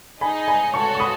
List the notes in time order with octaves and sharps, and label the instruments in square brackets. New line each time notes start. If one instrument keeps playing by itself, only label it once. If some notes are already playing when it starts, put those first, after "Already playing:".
[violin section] D#4 G#4 D#5 [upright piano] G#5 B5
[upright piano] G#5 B5
[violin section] F#4 A4 C#5 [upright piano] A5 C#6
[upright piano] C#6
B5 D#6